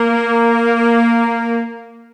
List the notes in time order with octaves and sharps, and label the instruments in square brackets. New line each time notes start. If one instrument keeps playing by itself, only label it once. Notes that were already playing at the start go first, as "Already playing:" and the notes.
Already playing: [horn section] A#3